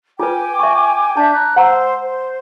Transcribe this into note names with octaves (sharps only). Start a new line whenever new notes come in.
F4 B4 G5 G#5 D6
E5 C#6
D4 E5 A5 G6
A#5 F#6
C5 F#5 A#5 E6
C5